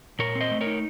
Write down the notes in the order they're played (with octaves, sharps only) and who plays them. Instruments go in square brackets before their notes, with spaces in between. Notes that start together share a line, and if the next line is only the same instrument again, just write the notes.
[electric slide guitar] A#2 A#4 C#5
C4
C5 D#5
A3
A#4 C#5
D#4